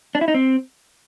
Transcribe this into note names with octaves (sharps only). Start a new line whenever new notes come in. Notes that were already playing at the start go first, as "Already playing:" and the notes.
D4
E4
D#4
C4